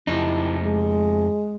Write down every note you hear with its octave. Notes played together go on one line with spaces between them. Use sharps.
F2 D#4 E4
G#3